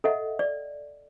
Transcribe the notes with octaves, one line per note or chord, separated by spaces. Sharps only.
A4 D#5 E5 F#5
D5